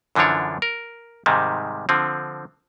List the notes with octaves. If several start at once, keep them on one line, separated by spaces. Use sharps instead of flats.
F#2 D3 E3 F3 D4 C#5
A#4
G#2 C3 D#3 G3 G#3
D3 F3 C4